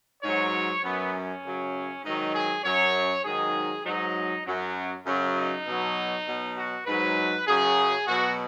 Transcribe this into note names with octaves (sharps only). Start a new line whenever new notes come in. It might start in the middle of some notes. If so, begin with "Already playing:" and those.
G#2 F#3 C#5
F#2 F#3 B3
C#4
F#2 C#3 F#3
G#2 D#3 F#3 D#4
G#4
F#2 F#3 C#5
G#2 D#3 F#3 G#4
G#2 F#3 D#4
F#2 F#3
F#2 C#3 F#3
D#4
B2 F#3
B2 F#3
F#4
G#2 F#3 B4
F#2 C#3 F#3 G#4
B2 F#3 F#4